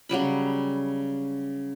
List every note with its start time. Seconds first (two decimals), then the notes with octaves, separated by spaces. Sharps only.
0.09 C#3 F#3 G3 B5